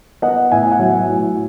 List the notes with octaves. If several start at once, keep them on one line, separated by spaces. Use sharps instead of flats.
B3 D#5 F#5
A2 E5 G#5
F#5
F#3 E5 G#5
A2